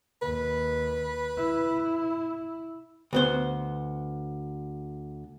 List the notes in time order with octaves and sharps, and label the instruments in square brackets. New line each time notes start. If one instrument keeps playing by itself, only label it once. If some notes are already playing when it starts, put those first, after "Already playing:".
[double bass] D#2 [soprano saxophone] B4
[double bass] E4
[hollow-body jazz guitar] D2 B3 C5